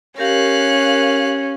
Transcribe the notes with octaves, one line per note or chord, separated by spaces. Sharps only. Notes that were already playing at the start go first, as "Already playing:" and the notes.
C#4 G4 A#4 F5 F#6